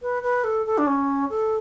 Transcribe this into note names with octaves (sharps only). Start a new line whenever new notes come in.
B4
B4
A4
A4
D4
C#4
A4